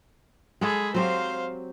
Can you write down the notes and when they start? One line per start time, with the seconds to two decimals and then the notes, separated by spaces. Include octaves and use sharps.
0.61 G#3 G#4 A4 B5
0.94 F#3 C4 G4 C5 F5